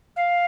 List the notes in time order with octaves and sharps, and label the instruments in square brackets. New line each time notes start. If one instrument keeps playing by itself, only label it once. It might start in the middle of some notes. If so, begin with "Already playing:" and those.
[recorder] F5